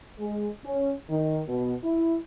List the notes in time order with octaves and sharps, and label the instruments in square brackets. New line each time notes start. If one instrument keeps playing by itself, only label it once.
[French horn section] G#3
C#4
D#3
B2
E4